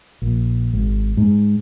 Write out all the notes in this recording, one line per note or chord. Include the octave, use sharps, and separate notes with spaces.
A#1
G#1
G#2